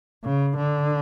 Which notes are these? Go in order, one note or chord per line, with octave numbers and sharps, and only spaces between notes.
C#3
D3